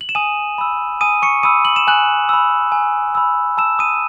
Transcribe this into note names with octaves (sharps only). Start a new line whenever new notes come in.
F#7
E7
G#5 D#6 D#7
B5 E6
G#5 D#6 D#7
C#6 C#7
B5 D#6 E6 D#7
F#7
E7
G#5 F#6 F#7
B5 E6
G#5
B5 E6
A5 E6 E7
D#6 D#7